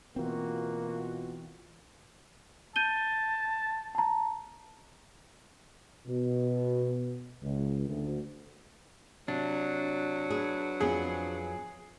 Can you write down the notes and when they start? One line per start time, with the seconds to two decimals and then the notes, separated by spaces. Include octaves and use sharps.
0.16 B2 E3 A#3 C4 F4 F#4
2.76 A5 G6 D#7 G7
3.95 A5 A#5
6.07 B2
7.42 C#2
7.89 D2
9.28 C3 F#3 D4
10.30 B3 G#4
10.80 F2 B3 G#4